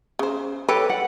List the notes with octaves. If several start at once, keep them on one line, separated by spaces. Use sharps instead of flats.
C#3 C5
G4 A4 B4 C#5
F#5